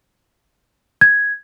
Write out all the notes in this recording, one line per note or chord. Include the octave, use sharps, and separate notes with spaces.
G#6